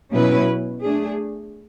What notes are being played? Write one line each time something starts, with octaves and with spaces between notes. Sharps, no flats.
B2 F#3 C#4 E4 B4
A3 D4 G#4